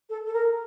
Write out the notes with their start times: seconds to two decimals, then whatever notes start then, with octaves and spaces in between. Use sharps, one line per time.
0.09 A4
0.26 A4
0.33 A#4